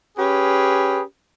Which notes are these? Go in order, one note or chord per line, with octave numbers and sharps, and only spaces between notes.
C#4 G4 G#4 B4